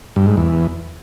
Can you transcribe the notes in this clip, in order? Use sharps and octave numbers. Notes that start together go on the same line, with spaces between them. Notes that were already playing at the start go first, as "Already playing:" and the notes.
G2
G#2
E2